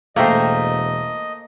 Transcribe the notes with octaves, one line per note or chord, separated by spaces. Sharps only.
E1 A3 A#3 A#4 C5 D#5 E5 G5